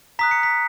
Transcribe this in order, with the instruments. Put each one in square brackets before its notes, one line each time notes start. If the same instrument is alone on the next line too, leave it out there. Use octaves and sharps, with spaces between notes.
[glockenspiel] A#5 D#6 F#6 B6
C#7
B6